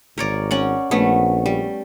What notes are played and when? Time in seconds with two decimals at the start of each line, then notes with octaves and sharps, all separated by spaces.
0.18 G#1 A#4 C#5 D5
0.51 C#4 D5 F#5
0.91 A#1 A3 B3 C#4
1.46 G3